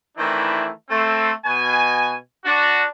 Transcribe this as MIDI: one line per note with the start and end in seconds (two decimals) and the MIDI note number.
0.18 0.69 51
0.18 0.69 52
0.18 0.69 57
0.18 0.69 60
0.18 0.69 62
0.18 0.69 64
0.90 1.31 57
0.90 1.31 60
1.45 2.15 47
1.45 2.15 80
2.45 2.85 62
2.45 2.85 66